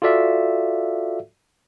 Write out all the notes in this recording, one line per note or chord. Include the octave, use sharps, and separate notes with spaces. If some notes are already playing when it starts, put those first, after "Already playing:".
F4 F#4 A4 D5 E5 F5